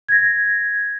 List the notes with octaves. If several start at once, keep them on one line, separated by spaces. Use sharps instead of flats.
G#6 A#6